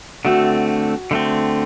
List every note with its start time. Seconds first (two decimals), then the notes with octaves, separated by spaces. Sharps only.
0.25 D3 A3 C4 F#4
1.11 D3 A3 C4